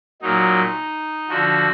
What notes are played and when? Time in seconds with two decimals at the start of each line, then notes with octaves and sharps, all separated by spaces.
0.22 A#2 F#3 D#4
1.29 D3 F3 F#4